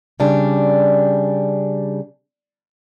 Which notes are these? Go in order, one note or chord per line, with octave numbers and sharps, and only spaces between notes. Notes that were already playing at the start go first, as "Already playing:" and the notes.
C#3 G3 D4